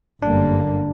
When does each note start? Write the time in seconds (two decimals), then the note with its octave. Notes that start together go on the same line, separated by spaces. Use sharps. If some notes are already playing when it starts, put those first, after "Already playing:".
0.22 G1 F#2 D3 G3 A#3 D4